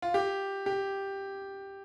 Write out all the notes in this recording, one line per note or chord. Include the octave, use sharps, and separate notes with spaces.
F4
G4
G4